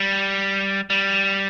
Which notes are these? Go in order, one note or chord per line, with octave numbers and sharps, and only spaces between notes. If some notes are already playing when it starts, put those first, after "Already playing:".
Already playing: G3
G3